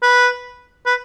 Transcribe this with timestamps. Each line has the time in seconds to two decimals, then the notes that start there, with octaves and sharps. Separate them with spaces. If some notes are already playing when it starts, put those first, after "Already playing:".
0.03 B4
0.86 B4